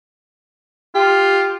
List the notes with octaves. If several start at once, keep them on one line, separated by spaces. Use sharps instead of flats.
F4 G4